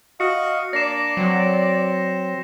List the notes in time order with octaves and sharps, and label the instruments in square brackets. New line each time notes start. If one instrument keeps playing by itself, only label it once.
[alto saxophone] F#4 [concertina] D#5 F5 [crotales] C#7
[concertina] A#3 D4 [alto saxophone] D5 [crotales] A#6 C7 E7
[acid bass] F#3 [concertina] C4